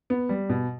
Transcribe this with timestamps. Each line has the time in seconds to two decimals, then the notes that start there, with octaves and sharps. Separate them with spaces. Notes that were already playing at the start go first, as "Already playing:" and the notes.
0.10 B3
0.29 G3
0.49 B2